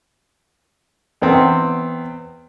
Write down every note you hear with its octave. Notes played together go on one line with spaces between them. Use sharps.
E2 B3 C4